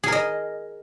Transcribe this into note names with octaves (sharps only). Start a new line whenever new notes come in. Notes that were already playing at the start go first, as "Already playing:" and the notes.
G#4 A#4 D#5